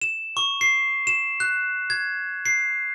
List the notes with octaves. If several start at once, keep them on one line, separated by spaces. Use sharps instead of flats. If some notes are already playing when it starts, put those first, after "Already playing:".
E7
C#6
C7
E7
F#6
G#6
C7